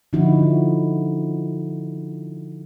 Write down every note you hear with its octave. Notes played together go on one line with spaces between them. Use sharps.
D3 F3 D#4 E4 F#4